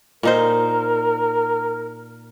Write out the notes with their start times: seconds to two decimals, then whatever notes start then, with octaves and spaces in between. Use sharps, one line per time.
0.23 A#2 D#4 A#4 C5